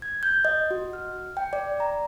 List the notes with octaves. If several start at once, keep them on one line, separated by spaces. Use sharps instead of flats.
G#6
G6
D#5
F#4
F6
G5
D5
A#5